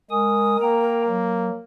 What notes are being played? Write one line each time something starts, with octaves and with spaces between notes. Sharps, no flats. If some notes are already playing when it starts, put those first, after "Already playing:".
G#3 A#4 G#5 D#6
A#3 G5 A#5
F#3